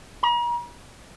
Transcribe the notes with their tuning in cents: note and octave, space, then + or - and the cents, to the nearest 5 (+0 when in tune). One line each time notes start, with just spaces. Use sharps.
A#5 +45